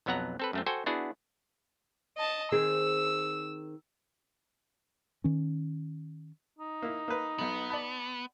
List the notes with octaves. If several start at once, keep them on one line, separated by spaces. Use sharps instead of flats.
B1 F2 F#3 B3 F#5 A#5
C4 A4 B4
F#2 A3 C4
F#4 A4 C5 G5 G#5
B3 D4 E4 F#4 G#4
D#5 A5
D#3 C4 G#4 E6
D#3 C#4
D#4
A#3 E4
A#3 B4
B1 B2 B3
D5 A5 B5